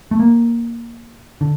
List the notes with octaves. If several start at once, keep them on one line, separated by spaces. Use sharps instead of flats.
A3
A#3
D3